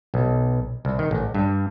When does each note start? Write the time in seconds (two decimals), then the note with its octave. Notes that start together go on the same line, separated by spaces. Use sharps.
0.14 B1
0.85 C2
0.99 D#3
1.11 A1
1.34 G2